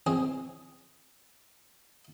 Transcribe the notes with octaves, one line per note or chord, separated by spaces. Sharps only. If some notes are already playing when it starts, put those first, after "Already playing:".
C4 C#4 G#4